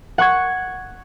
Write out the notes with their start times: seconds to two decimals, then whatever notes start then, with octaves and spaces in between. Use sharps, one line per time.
0.18 F#5 C#6 G#6